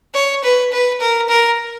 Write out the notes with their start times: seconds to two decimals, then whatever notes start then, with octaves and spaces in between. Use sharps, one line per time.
0.14 C#5
0.43 B4
0.72 B4
1.00 A#4
1.29 A#4